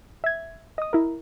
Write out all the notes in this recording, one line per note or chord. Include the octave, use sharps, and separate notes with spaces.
E5 G#6
D#5 D#6
E4 A#4